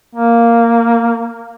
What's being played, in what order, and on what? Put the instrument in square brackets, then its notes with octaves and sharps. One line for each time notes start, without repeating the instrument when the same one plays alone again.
[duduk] A#3